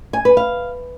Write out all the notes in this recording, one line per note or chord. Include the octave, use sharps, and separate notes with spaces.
G#5
B4
F5